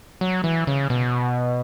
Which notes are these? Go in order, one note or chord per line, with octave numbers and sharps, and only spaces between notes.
F#3
E3
C#3
B2